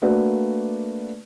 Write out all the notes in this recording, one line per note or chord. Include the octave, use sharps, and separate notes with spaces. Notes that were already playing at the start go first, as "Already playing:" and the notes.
A3 A#3 D4 F#4 B4 D5